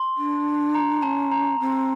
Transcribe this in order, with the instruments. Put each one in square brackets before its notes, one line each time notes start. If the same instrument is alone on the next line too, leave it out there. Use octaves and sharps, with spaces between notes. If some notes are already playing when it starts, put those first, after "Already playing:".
Already playing: [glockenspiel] C6
[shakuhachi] D4
[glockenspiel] A#5
[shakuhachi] C#4 [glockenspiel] A5
[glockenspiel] A#5
[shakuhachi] C4